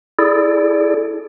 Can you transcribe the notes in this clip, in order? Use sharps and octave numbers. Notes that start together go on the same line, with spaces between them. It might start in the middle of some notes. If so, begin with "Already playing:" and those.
E4 G#4 A4 D5